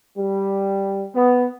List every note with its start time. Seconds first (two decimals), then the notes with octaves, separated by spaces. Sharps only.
0.17 G3
1.14 B3